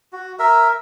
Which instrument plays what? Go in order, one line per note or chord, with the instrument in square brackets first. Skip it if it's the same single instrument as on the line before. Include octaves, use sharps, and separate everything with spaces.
[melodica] F#4
A#4 E5